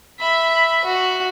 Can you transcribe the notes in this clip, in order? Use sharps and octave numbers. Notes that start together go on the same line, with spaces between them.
E5 B5
F#4